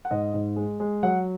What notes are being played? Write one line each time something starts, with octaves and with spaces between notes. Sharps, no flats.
F#5
G#2 D#5
G#2
G#3
G#3
F#3 F#5